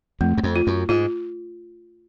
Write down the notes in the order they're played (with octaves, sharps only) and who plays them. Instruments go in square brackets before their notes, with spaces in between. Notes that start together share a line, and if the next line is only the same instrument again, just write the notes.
[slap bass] F2 [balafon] A3
[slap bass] F#2
F2
[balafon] F4
[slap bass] F#2
[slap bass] G#2 [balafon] F4